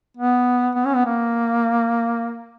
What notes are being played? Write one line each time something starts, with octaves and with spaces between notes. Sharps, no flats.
B3
B3
C#4
B3
A#3